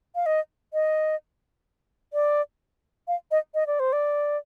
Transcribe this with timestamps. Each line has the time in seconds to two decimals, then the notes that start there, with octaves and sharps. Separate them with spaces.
0.15 F5
0.26 D#5
0.73 D#5
2.13 D5
3.08 F5
3.31 D#5
3.54 D#5
3.67 D5
3.80 C5
3.93 D5